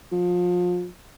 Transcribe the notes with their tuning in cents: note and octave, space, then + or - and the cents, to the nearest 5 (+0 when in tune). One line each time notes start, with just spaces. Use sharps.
F3 +30